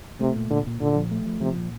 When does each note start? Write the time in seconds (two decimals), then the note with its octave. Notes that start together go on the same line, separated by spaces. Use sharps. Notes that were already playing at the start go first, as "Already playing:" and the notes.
0.21 C3 A3
0.36 A#2
0.50 A#2 D3
0.66 A#2
0.81 A#2 D3
0.96 F3
1.11 A3
1.26 F3
1.41 C3 F3
1.56 A#2